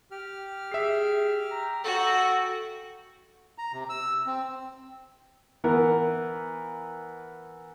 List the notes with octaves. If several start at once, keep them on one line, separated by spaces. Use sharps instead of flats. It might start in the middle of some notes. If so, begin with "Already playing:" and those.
G4 F6
G#4 E5 C7
A#5
F#4 A4 G5
A#5
C3
E6
C4
E3 B3 A#4